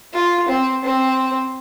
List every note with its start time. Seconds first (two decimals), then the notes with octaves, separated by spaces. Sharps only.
0.14 F4
0.48 C4
0.84 C4